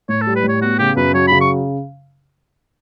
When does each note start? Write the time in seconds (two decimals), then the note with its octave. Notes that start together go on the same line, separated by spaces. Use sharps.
0.09 A2 C#5
0.21 A4
0.27 G3
0.35 B4
0.44 A2 C#5
0.62 B3 F#4
0.79 C#3 G4
0.96 F#2 B4
1.14 F#3 C#5
1.27 B5
1.32 C#3
1.41 C#6